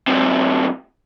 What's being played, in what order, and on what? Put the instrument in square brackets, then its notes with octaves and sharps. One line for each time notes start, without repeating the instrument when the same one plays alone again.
[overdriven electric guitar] F#2 C3